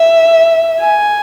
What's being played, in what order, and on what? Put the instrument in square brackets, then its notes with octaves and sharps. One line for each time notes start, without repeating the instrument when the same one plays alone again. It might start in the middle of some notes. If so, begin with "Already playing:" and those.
Already playing: [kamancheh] E5
G#5